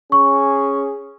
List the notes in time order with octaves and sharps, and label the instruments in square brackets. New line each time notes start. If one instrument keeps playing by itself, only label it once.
[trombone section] C#4 G#4 [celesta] C#6